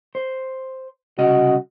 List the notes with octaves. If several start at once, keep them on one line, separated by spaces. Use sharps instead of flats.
C5
C2 C#3 F#4 D#5